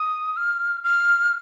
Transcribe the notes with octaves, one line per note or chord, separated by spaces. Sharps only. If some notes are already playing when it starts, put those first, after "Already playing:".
Already playing: D#6
F6
F6